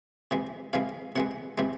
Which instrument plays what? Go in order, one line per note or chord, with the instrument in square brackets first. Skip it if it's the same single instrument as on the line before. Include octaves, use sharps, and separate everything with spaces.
[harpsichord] C3 E3 G#3
C3 E3 G#3 F5
C3 E3 G#3 F#5
C3 E3 G#3